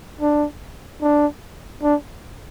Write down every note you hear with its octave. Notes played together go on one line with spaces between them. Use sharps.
D4
D4
D4